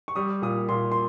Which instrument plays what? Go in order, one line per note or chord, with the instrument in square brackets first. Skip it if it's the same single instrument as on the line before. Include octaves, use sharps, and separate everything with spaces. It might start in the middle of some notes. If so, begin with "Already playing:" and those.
[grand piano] C#6
G3 D#6
A#2 D#6
A#2 C6
C6